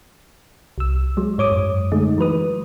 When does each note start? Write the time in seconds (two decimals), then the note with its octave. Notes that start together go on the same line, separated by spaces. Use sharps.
0.78 C2 E6
1.17 F#3 G#3
1.38 G#2 C#5 D6 D#6
1.52 F#2
1.92 D3 G#3 A3 D#4
2.18 E3 F#3 B4 D#6